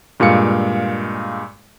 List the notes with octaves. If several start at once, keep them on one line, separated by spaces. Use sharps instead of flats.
G2 A#2 G#3 F5 C#7